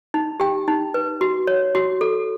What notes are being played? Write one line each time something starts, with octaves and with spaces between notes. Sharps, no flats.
D#4
G4 G5
D#4
B4
F#4
C#5
F#4
A4